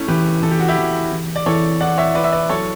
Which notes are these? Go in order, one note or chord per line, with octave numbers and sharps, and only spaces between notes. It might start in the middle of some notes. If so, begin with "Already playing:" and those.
Already playing: A3 C#4 E4
E3 G4 B4
E3 A4
G4
F#4
E4 G4
E3
E3
D5
E3 A4 C#5
E4 D5 F#5
C#5 E5
E4 B4 D5
E5
B4 D5
F#3 A4 C#5